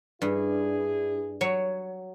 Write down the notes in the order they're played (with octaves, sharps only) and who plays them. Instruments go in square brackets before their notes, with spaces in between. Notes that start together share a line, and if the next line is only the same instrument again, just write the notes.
[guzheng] G2 [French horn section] D4 E4 G#4
[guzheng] F#3 C#5